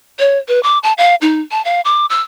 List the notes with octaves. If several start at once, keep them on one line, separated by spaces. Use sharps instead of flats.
C#5
B4
D6
A5
F5
D#4
A5
F5
D6
E6